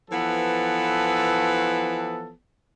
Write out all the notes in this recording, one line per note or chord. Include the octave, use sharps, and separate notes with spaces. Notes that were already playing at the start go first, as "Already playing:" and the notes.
E3 F3 B3 A4